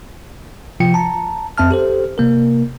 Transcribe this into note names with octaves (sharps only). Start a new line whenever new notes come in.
C3 F3 F4 G5 C#7
A5 A#5
F2 C4 E5 A5 F6
G4 A4 C5
C3 A#3 A#4